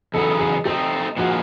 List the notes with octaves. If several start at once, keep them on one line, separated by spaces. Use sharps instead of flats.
E2 C#3 F#3 B3 D#4 A4
G#4
A3 C4 D#4 G4
A#2 F3 G#3 F#4